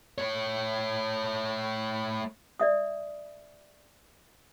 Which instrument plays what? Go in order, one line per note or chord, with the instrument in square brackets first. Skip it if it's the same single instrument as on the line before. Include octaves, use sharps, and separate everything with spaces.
[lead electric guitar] A3 C#5
[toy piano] D5 E5 D#6